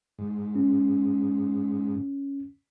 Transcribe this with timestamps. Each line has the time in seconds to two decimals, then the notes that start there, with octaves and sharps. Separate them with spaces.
0.19 G#2
0.55 C#4